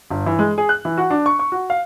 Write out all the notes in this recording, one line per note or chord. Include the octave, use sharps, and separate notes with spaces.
G1
E3
G#3
G#4
F#6
E3
F#4
D4
C#6
C#6
F#4
F5